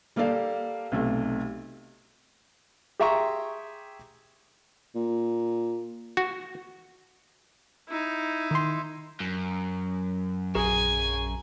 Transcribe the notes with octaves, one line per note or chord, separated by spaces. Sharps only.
G3 A#3 G4 A4 D5 F5
B1 C3 A3
G4 G#4 E5 A#5 C6 C#6
A#2
F#4
D#4 E4
D#3 C6
F#2
A#1 G#4 G#5 A#5 C#6 E7